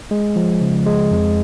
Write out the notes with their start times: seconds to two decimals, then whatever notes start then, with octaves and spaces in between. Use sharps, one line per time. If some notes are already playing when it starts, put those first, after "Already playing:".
0.11 G#3
0.36 F3
0.61 C#3
0.86 G#3
1.11 F2